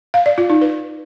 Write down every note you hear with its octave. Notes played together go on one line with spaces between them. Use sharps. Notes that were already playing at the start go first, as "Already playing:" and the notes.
F5
D5
F4
D#4
B4